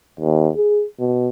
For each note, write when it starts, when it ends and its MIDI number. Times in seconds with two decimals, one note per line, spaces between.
0.20 0.49 39
0.57 0.84 68
0.99 1.29 47